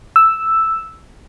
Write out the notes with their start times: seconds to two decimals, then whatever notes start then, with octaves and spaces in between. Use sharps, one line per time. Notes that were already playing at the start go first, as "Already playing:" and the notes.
0.16 E6